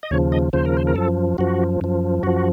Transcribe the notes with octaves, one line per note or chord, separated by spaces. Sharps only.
D#5
D#2 C#3 F3 C#5
D#5
D#2 C#3 F3 C5
A#4
C5
A#4
F#2 F3 A4
F#2 F3 F#4
F#2 F3
F#2 F3 F#4